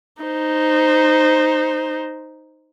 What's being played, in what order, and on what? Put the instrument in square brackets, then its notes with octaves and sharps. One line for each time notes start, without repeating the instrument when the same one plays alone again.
[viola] D#4 C5